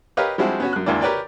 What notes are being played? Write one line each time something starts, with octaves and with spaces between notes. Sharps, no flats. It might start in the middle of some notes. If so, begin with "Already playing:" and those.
G4 A#4 B4 C#5 D#5 F5
F3 G3 G#3 C4 E4 F#4
B3 C#4 F#4
F#2 F#6
G#1 E2 E3 A#3 D4
G4 A#4 B4 C#5 D5 G5